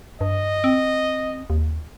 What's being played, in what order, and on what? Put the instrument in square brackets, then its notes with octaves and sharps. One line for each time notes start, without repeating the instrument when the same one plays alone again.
[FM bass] G2 [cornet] D#5
[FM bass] C4
D#2